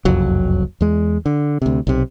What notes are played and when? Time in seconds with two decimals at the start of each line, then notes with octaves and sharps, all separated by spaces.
0.05 F#1 C2 F2 F#3
0.81 E2 G#3
1.26 D3
1.62 D2 C3
1.87 B1 C3